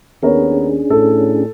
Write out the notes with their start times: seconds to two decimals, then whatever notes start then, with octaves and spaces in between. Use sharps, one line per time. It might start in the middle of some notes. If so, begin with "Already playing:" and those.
0.23 D#2 B3 C#4 D4 G#4 A#4 C#5
0.90 A2 A4